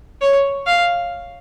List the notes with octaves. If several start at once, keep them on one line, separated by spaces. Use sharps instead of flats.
C#5
F5